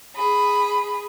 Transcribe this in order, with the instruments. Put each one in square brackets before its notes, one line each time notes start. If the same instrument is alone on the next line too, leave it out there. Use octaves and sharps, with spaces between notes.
[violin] G#4 B5